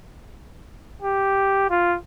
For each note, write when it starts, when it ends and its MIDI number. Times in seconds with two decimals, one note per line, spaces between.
1.02 1.70 67
1.70 1.97 65